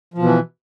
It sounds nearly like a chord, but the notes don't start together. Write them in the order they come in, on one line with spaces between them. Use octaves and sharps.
F3 B2 E3